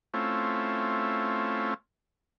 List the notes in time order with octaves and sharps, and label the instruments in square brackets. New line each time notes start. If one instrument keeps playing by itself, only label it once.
[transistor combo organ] A3 C4 C#4 E4 F4